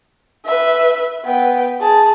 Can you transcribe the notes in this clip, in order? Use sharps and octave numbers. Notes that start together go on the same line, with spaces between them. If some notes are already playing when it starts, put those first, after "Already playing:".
B4 E5
B3 G5
G#4 A5